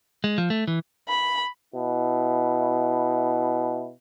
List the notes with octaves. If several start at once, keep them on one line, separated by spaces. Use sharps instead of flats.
G#3
F3
A3
E3
B5
B2 E4